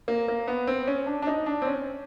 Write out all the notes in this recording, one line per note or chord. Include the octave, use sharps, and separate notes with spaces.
A#3
A#3
B3
C4
C#4
D4
D4
D#4
D4
C4
C#4